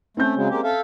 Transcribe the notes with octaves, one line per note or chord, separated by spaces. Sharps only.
A3 C4 C#4 G6
C#3 F#3 G#3
G#3 A#3 G4
A4 E5 F5